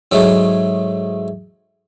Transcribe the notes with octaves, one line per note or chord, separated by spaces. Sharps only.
G#2 F#3 G#3 A3